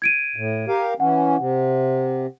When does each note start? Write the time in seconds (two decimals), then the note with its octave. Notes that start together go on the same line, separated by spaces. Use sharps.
0.02 G#6 D7 D#7
0.36 A2
0.68 G4 A#4 F5
1.00 E3 C#4 F#5
1.39 C3